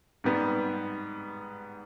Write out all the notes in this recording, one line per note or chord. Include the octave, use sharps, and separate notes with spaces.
G#2 G3 B3